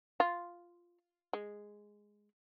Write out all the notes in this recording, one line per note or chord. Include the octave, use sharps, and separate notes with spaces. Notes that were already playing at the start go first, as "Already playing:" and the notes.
F4
G#3